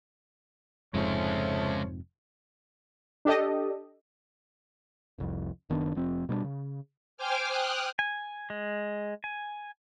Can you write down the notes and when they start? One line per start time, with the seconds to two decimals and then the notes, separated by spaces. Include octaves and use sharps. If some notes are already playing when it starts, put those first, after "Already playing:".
0.94 F1 F2 G#2 C#3 F3 G#3 A3 C#5
3.25 D4 G4 A4 D#5
5.18 F1 C2 F2
5.70 F#1 D#3 B3 D4
5.95 F1 F3 C4
6.29 B2 G3 A#3 D4
6.44 C#3
7.17 C5 G5 G#5 D6 F6
7.48 G5 D#6 F6 F#6
7.99 G#5
8.50 G#3
9.24 G#5